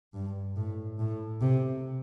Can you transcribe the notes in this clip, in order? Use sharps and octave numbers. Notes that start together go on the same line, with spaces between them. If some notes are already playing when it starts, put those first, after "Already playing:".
G2
A2
A2
C3